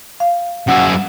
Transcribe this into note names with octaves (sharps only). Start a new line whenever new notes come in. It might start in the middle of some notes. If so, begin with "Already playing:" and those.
F5
F#2 E4 F#5